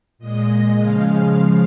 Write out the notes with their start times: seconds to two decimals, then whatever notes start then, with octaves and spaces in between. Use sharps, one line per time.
0.18 A#2 G#3 D#5
0.79 C#3 F3 G#3 F5